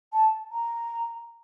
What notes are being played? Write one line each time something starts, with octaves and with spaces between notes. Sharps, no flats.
A5
A#5